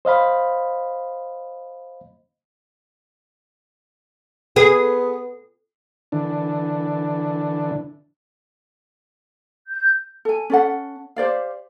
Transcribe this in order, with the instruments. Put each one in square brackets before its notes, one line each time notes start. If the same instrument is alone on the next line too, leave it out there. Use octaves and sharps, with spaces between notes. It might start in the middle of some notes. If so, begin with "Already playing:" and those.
[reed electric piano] C5 D#5 F5 B5
[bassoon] B3 [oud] G#4
[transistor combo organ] D3 E3 D4
[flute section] G6
[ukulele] A4 G#5
C#4 A4 F#5
G4 C5 D5 F5